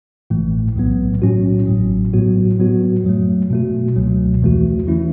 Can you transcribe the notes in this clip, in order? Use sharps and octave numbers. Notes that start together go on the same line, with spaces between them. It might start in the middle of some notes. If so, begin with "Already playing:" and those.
A1 A2 E3 A3
B1 A2 F#3 B3
A2 F#3 C#4 F#4
A1 A2 F#3
A2 F#3 B3 F#4
A2 F#3 B3 F#4
F#2 F#3 A3
B2 A3 F#4
C#2 B2 F#3 A3
E2 E3 A3 F#4
E3 A3 C#4 E4